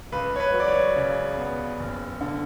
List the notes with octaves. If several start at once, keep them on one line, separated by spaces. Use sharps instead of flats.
C#2 B4
C#5
B4
F#3
D5
C#5
C#3
B3
F#1
D3